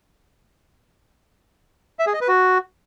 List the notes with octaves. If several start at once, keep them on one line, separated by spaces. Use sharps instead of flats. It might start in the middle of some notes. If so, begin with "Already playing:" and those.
E5
G#4
D#5
B4
F#4